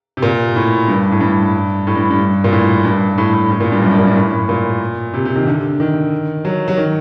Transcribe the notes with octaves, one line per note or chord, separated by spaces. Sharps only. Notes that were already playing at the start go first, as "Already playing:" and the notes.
C3
A#2
A2
G2
A2
G2
A2
G2
G2
A#2
A2
G2
A2
A2
A2
A#2
G2
F#2
G2
A#2
G2
A2
A#2
C3
C3
D#3
D3
D#3
F#3
F#3
D#3